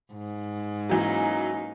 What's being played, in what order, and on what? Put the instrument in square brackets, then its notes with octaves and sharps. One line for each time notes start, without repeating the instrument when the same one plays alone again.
[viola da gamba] G#2
[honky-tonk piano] E3 F#3 [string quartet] A#3 C#4 D#4